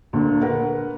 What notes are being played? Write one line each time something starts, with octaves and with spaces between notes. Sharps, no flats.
D2 A#2 D3
A#4 B4 F#5